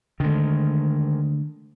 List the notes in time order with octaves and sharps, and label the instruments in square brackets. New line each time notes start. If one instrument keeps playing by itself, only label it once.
[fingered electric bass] D3 A3 [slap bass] D#3 G#3